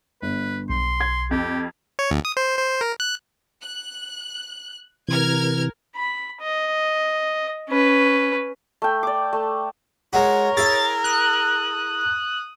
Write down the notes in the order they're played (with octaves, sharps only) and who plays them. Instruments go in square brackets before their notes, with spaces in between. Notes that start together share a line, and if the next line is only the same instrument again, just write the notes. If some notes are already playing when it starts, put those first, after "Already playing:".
[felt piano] G1 [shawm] B4
[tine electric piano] B1 [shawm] C6
[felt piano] G#6
[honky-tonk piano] F2 [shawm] G4
[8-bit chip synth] C#5
D2
D#6
C5
C5
A#4
F#6
[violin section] F#6
[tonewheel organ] C3 E3 [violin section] A#4 F6 G#6
[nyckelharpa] B5
D#5
C#4 B4
[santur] A3 G5
D5 D6
A3
[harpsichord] G#3 F#4 [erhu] A#4 [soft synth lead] C#5
[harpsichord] E4 G#4 [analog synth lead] A6
[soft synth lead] D#6 [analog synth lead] F#6